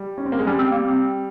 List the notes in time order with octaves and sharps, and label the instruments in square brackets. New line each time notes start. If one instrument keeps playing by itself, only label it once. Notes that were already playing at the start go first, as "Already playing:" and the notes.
Already playing: [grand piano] G3
C#4
C4
A#3
G#3
[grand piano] G3 [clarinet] C#4
[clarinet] C4
A#3
C4